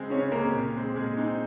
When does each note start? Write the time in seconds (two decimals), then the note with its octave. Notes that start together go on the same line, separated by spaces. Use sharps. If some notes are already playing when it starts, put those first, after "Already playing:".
Already playing: C#3 G#3 C4
0.10 C#3 C#4 C#5
0.32 G#3 A#3 C4 A#4
0.53 A#2
0.75 G#3 C4
0.96 A#2 G#3 G#4
1.17 G#3 C4 D#4